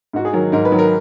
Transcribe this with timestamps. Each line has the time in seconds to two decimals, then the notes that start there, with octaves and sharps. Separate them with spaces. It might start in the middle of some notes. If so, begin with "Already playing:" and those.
0.13 G#2 F#4
0.25 G#4
0.33 D#3 F#3 A#4
0.52 G#2 A#4
0.65 B4
0.71 D#3 F#3
0.79 A#4